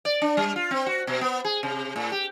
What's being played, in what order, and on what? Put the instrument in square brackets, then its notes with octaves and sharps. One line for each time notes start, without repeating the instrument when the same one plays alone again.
[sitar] D5
D4
G3
F4
C4
F#4
B2
B3
G#4
C3
A2
G4